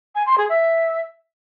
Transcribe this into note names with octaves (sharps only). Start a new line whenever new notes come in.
G#5
C6
G#4
E5